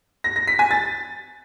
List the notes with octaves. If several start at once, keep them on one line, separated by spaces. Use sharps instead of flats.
A#6
A#6
B6
G#5
A6